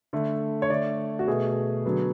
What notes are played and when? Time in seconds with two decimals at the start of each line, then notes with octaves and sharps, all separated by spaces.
0.13 D3 A3
0.62 C#5
0.70 D3 A3 D5
1.19 F#4
1.27 B2 A3 G#4
1.85 D3 F#3 B3